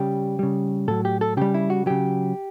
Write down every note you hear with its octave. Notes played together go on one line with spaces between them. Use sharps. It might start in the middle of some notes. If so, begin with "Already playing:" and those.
Already playing: C#3 G3 G4
C#3 G3
A2 F#3 A4
G4
A4
C#3 G3 G4
E4
F#4
C#3 F#3 G4